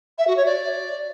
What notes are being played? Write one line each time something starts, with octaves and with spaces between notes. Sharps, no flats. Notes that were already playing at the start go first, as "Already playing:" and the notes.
E5
F#4
C#5
D5